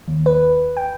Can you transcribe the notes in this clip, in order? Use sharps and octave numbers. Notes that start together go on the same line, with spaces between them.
D#2
B4
G5